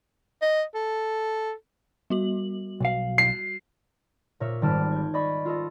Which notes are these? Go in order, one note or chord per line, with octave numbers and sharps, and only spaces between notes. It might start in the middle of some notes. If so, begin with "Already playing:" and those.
D#5
A4
G3 F#4 F#7
B1 F5
C7
A#2 A#4 C#5 E5
G#1 G3 G4 A5 F6 D7
G6 G#6
D5 D#5 B5 C#6
F4 A4 D#5